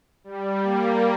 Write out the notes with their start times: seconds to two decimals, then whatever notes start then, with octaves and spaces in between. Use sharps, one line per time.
0.24 G3
0.63 A#3